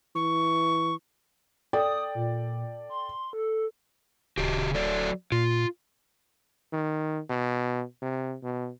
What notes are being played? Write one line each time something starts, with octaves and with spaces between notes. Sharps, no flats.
E3 C#6
A4 D5 G5 D#6
A#2
C6
A4
D1 C#3 F#4 G4
F#3 A4 D5
A#2 F4
D#3
B2
C3
B2